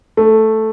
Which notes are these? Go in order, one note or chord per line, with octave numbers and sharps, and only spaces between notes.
A3